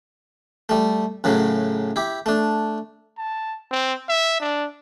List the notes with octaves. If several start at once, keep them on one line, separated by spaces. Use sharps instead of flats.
G3 A3
F#2 A2 C#3 F#3
E4 G4
A3 D4
A5
C4
E5
D4